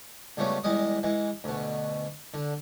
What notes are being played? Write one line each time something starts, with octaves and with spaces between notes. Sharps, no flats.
C#2 G3 A3 B3 C#4
E2 G3 G#3 D#5 D#6
E3 G#3
D2 B2
D3